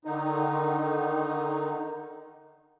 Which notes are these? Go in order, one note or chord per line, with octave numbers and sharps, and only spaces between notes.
D3 D#3 D#4